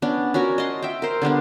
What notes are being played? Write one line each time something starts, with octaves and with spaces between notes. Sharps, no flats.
B3 C#4 D4
C#4 F#4 A#4 C#5
D#5 A5 C6
E5 G5
A#4 C5
D3 G3 B3 D4